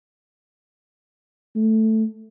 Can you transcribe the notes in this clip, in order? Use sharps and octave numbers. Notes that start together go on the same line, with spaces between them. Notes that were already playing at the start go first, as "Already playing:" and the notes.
A3